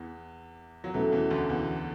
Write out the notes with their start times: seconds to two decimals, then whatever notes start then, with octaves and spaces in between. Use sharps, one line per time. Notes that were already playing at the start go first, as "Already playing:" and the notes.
Already playing: E2 E3
0.84 F#3
0.94 E2 B2 E3 A3 C#4 F#4 A4
1.12 E2 E3
1.30 D2 D3
1.49 E2 E3